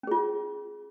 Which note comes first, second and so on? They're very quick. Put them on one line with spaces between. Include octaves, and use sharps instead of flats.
C#4 G#4 F4